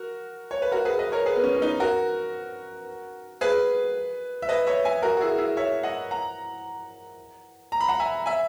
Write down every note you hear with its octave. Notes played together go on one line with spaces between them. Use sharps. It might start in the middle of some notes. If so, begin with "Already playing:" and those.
Already playing: F#4 A#4
C#5
B4
F#4 A#4
G#4 B4
B4 D#5
A#4 C#5
G#4 B4
B3
C#4
C#4
B3 D#4
F#4 A#4
G#4 B4
E5
B4 D#5
C#5 E5
E5 G#5
F#4 A#4
F#4
E4 G#4
E4 G#4
C#5 E5
D#5 F#5
F#5 A#5
A#5
B5
F#5 A#5
E5 G#5
E5 G#5